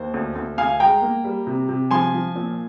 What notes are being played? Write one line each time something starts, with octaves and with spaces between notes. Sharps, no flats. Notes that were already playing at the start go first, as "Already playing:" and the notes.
Already playing: D#2 C5
D2
D2
D2 F5 G#5
G#3 G5 A#5
A#3
G3
C3
C3
F3 G#5 C6
F3
A#2